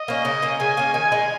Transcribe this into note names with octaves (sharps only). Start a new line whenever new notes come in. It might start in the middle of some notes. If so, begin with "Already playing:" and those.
Already playing: D#5
A#3 C#4
C#3
A#3 C#4
C#3 G#5
A#3 C#4
D#3 G#5
G#3 D#4